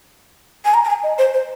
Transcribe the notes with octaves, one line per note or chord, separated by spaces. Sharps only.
G#5
A#5
A#5
G#5
D#5
C5
C5